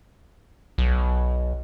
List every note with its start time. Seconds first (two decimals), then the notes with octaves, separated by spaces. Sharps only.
0.78 B1